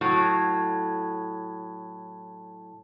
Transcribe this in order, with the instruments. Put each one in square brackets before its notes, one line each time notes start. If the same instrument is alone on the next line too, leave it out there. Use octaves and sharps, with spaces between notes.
[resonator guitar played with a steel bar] A2 F#3